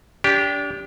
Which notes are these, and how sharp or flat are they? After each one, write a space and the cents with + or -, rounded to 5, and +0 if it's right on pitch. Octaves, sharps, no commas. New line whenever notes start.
D4 -30 G4 +0